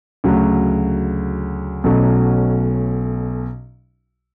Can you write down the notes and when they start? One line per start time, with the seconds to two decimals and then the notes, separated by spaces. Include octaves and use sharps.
0.24 D2 C#3 F#3
1.84 B1 B2 F#3 A3 C#4